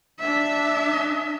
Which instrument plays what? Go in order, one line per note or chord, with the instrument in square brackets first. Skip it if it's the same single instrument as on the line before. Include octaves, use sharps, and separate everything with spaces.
[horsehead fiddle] D4 E5